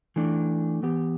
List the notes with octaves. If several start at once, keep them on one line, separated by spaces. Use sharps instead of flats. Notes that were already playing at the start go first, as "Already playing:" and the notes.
E3 A3 D4
E3 B3 G4